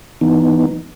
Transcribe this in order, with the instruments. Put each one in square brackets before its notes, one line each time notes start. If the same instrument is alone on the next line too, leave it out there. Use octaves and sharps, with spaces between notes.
[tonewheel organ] E3 B3 D#4